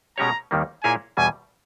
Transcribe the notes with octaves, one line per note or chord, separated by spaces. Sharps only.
B2 G#3 C#4 G4 C#5 A#5
D#2 D#3 G3 A#3
A#2 A#3 E4 G#4 C#5 G#5
E2 B2 G3 G#5